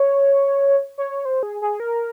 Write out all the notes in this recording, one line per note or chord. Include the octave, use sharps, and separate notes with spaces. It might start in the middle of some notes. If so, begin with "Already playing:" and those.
Already playing: C#5
C#5
C5
G#4
G#4
A#4